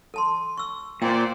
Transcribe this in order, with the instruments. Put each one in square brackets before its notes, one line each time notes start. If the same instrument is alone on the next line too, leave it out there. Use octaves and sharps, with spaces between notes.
[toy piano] A4 A5 C6
C#6 E6
[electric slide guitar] A#2 [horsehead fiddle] C5 D5 [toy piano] G5